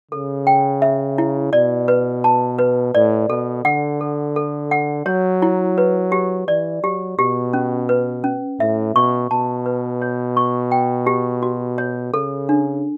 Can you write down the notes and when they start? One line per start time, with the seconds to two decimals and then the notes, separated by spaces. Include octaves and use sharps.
0.11 C#3 A4
0.47 G5
0.82 E5
1.18 E4
1.53 B2 D5
1.88 B4
2.24 A5
2.59 B4
2.95 A2 D5
3.29 B2 A4
3.65 D3 F#5
4.01 A4
4.36 A4
4.71 F#5
5.06 F#3 C#5
5.42 E4
5.78 B4
6.12 G4
6.48 E3 D5
6.83 F#3 G4
7.18 B2 G4
7.53 C#4
7.89 B4
8.24 C#4
8.59 A2 E5
8.95 B2 C#6
9.31 B2 A5
9.66 B4
10.02 C#5
10.37 C#6
10.72 G5
11.07 G4
11.43 F#4
11.78 C#5
12.13 C#3 A4
12.49 D4